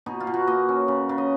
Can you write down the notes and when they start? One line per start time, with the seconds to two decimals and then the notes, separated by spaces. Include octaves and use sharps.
0.06 B2 D#4
0.20 F4
0.27 B2
0.34 F#4
0.47 A#3 D#5
0.69 C#4
0.88 C#3
1.09 C#3
1.18 D#5